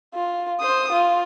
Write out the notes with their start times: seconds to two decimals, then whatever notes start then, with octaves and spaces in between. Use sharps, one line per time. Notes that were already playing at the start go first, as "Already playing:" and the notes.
0.14 F4
0.60 C5 D#6
0.93 F4